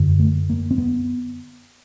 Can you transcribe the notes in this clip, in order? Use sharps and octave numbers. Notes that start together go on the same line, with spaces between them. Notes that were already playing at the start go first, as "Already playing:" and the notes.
Already playing: F#2 D3
A3
A#3
C4
B3